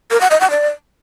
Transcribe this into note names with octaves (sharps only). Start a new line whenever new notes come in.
A#4
F#5
D#5
F#5
D5